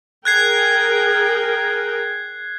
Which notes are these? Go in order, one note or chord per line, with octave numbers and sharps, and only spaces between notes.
G#4 A#4 G5 F#6 G#6 C7